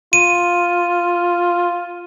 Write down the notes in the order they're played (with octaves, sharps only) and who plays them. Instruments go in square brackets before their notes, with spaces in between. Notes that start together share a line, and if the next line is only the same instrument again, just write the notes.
[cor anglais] F4 [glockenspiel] D#7